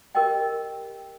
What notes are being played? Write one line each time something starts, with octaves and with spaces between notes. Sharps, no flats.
G4 A#4 C5 D#5 G5